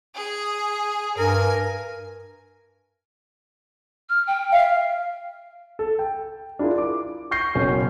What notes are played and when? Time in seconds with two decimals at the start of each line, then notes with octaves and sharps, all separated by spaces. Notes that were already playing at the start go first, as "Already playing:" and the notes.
0.15 G#4
1.18 G2 A#4 G#5
4.09 F6
4.27 G5
4.52 E5 F5
5.79 A4
5.99 G5
6.59 D4 E4 F4 G#4 A#4
6.78 D6
7.31 C#6 G6 A#6 C7
7.55 F#1 B2 C#4